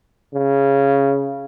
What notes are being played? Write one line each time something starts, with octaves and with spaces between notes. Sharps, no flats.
C#3